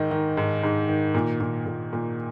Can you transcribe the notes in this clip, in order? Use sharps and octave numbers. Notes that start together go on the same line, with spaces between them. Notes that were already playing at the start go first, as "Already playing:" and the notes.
Already playing: G#2 D#3 D#4
D#3
G#2
G#2
D#3
A#2
A#2
A#2
A#2